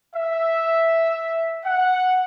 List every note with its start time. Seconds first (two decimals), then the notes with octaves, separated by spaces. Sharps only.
0.15 E5
1.65 F#5